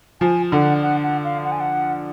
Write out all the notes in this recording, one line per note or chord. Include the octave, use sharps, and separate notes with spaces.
F3 G#5
D3 F#5
F#5
F#5
F5
F#5
G#5
F#5